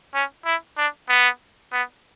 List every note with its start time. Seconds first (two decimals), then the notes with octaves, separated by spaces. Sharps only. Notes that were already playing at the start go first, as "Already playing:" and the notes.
0.14 C#4
0.45 E4
0.78 D4
1.09 B3
1.73 B3